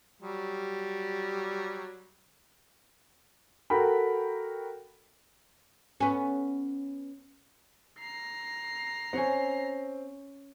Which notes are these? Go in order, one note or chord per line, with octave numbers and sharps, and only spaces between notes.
F#3 G3
F#4 A4 A#4 G5 B5
B3 C#4
A#5 C7
C4 C#4 C#5 F#5